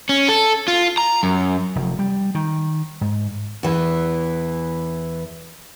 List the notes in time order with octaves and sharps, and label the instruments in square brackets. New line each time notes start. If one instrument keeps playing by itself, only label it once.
[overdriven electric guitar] C#4
A4
F4
A#5
F#2
[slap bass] F1
G3
D#3
G#2
[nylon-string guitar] E2 E3